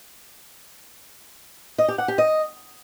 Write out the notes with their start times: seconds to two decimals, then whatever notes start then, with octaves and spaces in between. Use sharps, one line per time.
1.78 D#5
1.88 G4
1.98 F#5
2.08 G4
2.18 D#5